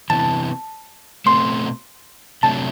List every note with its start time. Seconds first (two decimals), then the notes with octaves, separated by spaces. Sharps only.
0.10 C3 E3 B3 A5
1.26 B2 A3 C4 C6
2.43 C3 F#3 A3 D4 A5